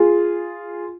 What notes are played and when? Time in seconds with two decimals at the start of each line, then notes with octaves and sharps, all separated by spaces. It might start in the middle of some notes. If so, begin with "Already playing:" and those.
Already playing: F4 G#4